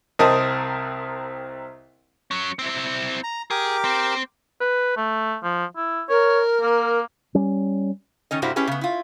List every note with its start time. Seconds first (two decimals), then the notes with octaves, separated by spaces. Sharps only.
0.19 C2 C4 A#4 D#5 A5 D#6
2.31 F#3 C#4
2.59 C4 E4
3.23 A#5
3.50 G4 G#4 A#4 D6
3.84 C4
4.61 B4
4.97 A3
5.43 F3
5.76 E4
6.09 A#4 C#5
6.61 A#3
7.35 G3 C#4
8.31 D#3 C#4 D#5
8.42 G2 C3 G3 E4 F#4 C5
8.56 C#4 E4 G4 G#4 B4
8.67 C#3 B3
8.81 E4 F4